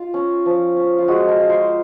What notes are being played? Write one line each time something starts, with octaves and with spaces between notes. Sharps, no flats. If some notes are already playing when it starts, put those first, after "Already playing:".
Already playing: F4
C#4
F3
C#4
F4
G#3 F#4
A#4
F4
C5